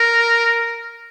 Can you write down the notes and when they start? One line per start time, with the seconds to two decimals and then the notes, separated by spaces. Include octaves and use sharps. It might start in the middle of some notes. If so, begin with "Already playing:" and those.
Already playing: A#4